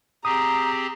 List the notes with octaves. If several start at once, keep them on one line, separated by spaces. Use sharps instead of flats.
C4 G4 G#4 A#5 D#6